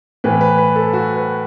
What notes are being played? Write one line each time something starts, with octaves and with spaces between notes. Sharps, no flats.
A2 E3 B4
B4
B4
A4
F#4
B4